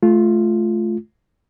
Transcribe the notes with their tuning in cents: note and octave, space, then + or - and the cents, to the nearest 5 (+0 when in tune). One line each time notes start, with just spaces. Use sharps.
A3 -25 F4 -5